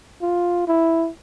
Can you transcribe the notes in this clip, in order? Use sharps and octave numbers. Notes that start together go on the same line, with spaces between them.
F4
E4